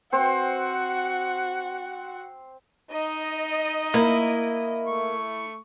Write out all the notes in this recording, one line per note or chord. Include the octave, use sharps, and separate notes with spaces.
C4 F#4 C5 F#5
D#4 D#5
A#3 E4 A#4
A3 C#6